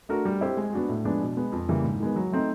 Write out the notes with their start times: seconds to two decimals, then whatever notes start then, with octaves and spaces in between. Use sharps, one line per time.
0.09 A3 D4 F#4 A#4
0.25 G3
0.41 C4 E4 G4 C5
0.57 G#3
0.73 B3 D4 F#4
0.89 A2
1.05 F3 G#3 B3 D4
1.21 B2
1.37 G#3 B3
1.52 F2
1.69 C#3 E3 G3 A#3
1.85 G#2
2.00 D#3 G#3 B3
2.16 F#3
2.32 A3 C4 D#4